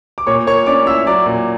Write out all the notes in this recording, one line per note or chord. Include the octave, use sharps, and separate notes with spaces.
D6
A#2 C#5 C#6
A#3 C#5 C#6
C#4 D5 D6
E4 E5 E6
F#3 D5 D6
A#2